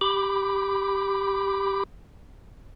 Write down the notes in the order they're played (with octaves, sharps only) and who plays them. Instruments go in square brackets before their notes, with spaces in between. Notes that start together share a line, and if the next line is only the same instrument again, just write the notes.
[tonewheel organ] G4 B5 D6